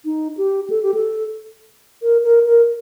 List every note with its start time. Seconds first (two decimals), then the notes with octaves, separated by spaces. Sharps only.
0.05 D#4
0.37 G4
0.70 A4
0.83 G4
0.94 A4
2.02 A#4
2.24 A#4
2.46 A#4